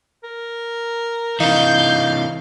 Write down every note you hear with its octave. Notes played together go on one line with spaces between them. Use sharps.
A#4
C3 E3 D#4 F5 G6